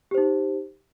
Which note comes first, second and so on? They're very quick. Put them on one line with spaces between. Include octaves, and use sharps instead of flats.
G4 C5 D#4